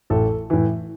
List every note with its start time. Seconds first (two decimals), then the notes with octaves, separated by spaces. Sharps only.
0.10 A1 A4
0.50 A2 E3